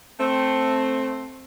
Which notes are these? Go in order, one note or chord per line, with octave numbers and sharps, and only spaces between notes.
A3 C4